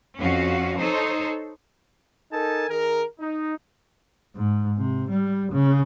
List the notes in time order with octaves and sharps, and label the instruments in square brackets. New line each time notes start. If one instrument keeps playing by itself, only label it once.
[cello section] F2 C#4 F#4 F5
D#4 A4 C5 C#5
[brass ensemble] D#4 A4 A#4 G#5 A5
D#3 G#4 A#4
D#4
[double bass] G#2
C3
G3
C#3